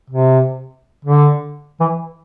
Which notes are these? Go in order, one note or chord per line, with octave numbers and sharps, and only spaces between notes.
C3
D3
E3